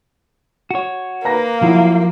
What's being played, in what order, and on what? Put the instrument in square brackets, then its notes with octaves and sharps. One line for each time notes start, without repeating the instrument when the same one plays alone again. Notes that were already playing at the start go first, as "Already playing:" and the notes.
[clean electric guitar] F#4 C#5
[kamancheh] A#3 [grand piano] B4 A#5 A#6
[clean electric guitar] F3 [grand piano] F#3 E4 F#4